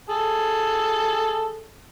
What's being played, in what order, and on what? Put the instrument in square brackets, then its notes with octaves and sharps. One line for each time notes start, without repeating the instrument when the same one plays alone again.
[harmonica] G#4 A4